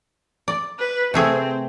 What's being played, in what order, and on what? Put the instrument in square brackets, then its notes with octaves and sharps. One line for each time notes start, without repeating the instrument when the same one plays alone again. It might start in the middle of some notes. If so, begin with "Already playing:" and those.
[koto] D5
[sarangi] B4
[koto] C3 A3 G#4 [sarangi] C4